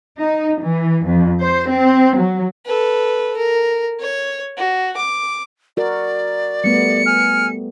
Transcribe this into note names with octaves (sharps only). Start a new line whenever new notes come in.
D#4
E3
F2
C5
C4
F#3
A4 B4
A#4
C#5
F#4
D6
F#4 A#4 D5
G3 A3 B3 C#7
G#5 F6